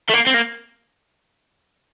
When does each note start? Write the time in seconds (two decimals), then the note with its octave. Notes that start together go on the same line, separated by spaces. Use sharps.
0.09 A3
0.14 A#3
0.27 C4
0.34 A#3